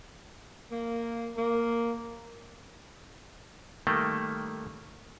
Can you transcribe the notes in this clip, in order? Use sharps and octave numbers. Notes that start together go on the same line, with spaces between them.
A#3
A#3
D#3 G3 A3 A#3